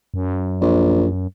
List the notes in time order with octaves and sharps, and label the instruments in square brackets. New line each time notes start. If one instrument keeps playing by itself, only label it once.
[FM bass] F#2
[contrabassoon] A#1